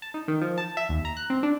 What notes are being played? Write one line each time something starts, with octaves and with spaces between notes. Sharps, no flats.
A5
D#4
D#3
F3
A5
E5
D#2
A#5
F#6
C4
D4